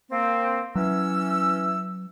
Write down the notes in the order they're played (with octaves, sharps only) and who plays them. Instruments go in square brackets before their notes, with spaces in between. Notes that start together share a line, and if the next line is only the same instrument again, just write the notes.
[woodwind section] A#3 C4
[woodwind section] E3 C#4 E6 [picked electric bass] F#3